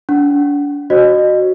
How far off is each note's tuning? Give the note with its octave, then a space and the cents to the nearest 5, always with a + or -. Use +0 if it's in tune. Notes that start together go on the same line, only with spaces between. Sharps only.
D4 -40 F#5 +0
F#4 +0 C5 +35 D#5 -30